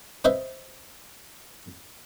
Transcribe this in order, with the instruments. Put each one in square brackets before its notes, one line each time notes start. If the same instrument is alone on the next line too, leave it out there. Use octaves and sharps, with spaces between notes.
[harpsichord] B4 C5 D#5 E5